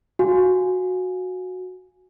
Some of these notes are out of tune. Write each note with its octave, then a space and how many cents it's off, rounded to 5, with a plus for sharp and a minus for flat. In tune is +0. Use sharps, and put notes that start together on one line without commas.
F#4 -10 F5 +15 G#5 +0